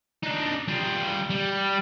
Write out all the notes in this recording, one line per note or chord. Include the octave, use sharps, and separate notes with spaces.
D4 D#4
G3 F4
G3